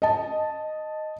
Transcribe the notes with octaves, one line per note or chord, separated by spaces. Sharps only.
D#5 A5